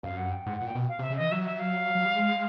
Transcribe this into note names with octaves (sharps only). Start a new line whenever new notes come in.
F#2 F5
F#5
G5
G#2 F#5
A#2 F#5
G5
B2
F5
C3
E5
C#3
E3 D#5
F#3 E5
E5
F5
F#3
G3
G#3